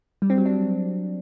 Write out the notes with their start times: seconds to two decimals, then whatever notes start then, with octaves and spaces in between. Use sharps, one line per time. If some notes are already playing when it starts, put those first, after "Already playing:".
0.22 G3
0.30 C4
0.38 F#3
0.45 D4